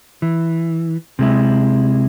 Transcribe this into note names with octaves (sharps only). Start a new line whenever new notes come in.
E3
C3 G#3 E4